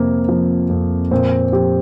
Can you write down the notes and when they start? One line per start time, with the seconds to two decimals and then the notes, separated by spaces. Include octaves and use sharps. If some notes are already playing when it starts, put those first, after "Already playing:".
Already playing: F2 C3 A#3 C4
0.28 F3
0.70 F2
1.11 A#2 C4
1.52 F3 G4